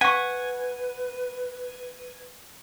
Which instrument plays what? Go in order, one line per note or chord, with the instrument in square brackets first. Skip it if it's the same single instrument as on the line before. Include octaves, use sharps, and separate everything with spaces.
[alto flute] B4 [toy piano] F5 C#6 [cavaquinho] F#5 [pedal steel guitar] G#5